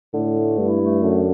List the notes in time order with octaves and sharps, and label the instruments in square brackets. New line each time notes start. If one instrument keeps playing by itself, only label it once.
[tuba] A2 [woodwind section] D3
[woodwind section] A3
[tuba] G2 [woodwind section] E4
[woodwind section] A3
[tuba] F#2 [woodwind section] D3